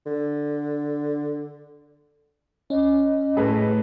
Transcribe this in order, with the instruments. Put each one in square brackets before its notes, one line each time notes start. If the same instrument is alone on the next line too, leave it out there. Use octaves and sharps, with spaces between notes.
[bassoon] D3
[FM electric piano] C#4 [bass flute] D#5
[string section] A2 [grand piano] G#4 A4 B4